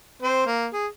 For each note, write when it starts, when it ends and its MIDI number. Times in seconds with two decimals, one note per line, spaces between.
0.22 0.45 60
0.22 0.45 72
0.46 0.67 58
0.73 0.87 68